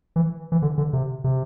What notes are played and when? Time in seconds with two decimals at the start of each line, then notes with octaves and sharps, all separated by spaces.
0.16 E3
0.52 E3
0.62 D3
0.78 D3
0.93 C3
1.24 C3